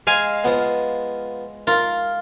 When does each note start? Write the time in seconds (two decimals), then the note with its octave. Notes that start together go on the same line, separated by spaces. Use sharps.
0.07 G#3 F5 G#5
0.44 F3 B3
1.67 F4 A#4